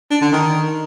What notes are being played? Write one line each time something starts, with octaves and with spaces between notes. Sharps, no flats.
D4
D3
D#3